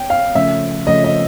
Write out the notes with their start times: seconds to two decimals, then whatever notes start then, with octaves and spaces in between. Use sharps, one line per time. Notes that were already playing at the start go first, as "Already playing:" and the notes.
Already playing: G5
0.10 F5
0.35 C#3 F3 A3 C#4 E5
0.87 C#3 F3 A3 C#4 D#5
1.04 D#5